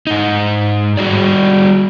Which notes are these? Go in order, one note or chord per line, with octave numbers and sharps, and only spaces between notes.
G#2 D#4
G3 F#4 G#4 D5